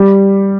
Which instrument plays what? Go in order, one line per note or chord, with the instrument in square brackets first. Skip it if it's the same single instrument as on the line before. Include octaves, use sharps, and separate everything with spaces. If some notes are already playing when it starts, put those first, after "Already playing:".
Already playing: [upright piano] G3